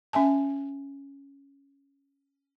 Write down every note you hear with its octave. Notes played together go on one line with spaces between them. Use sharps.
C#4 E5 G#5 A5